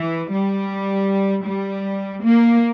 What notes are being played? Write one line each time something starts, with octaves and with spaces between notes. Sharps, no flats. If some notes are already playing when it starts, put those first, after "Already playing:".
Already playing: E3
G3
G3
A#3